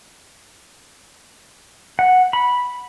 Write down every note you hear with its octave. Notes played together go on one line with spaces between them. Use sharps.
F#5
B5